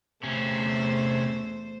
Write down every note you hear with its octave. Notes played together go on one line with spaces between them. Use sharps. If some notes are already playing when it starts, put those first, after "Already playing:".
E2 C3 A3 C#4 C5